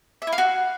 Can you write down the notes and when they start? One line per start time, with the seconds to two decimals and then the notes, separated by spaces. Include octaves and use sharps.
0.22 E5
0.27 E4
0.33 F5
0.38 F#4